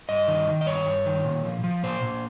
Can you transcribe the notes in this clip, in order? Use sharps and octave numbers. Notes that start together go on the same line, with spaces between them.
G2 D#5
D#3
D#3
D#5
G2 C#5
G2
D#3
A#2
F3
F3
A#2 C5
A#2